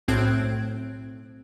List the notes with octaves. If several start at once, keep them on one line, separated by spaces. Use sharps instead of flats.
B1 A2 C4 F#6 G#6 D7